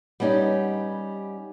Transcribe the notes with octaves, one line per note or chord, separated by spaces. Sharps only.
G3 B3 C#4 D#4 G4